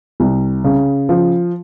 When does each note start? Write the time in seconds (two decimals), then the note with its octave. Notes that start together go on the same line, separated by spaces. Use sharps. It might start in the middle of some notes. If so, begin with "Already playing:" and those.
0.20 C2
0.64 C#3
1.09 F3